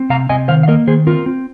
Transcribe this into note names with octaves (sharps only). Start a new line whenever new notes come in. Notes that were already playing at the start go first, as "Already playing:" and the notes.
Already playing: C4
C3 F5 A#5
C3 D#5 G#5
D#3 C5 F5
F5
A#3 A#4 D#5
D#3 G#4 C5
C4 F4 A#4
C4